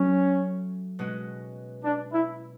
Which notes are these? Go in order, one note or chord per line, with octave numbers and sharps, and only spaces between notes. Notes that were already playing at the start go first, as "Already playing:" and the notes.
Already playing: F#3 A3 C#4
B2 G#3 C#4 F#4
D4
E4